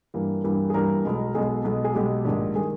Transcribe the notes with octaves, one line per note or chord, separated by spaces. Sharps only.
G2 E3 G3 A#3
G2 E3 G3 A#3
G#4
G2 E3 G3 A#3 A#4
B1 B2 G#3
B1 B2 G#3 G#4
B1 B2 G#3
G#4
B1 B2 G#3 G4
A#1 G#2 D#3 G#3
D#3 G#3 G#4